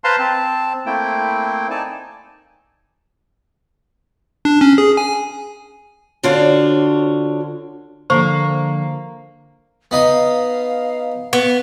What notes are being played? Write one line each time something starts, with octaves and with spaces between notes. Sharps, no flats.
B4 C5 F5 A5 A#5 C6
C4 A5
A3 A#3 C4 E4 G5
D#4 D5 G#5 A5
D4
C#4
G#4
G#5
D3 D4 F4 F#4 C5 C#5
D3 F3 A#3 C5 C#6
B3 D#4 F5 D#6
B3